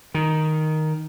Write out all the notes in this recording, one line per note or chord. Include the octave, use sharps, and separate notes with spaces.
D#3